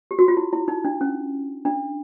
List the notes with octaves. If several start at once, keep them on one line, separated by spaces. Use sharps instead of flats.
G4
F#4
F4
E4
E4
D#4
D4
C#4
D4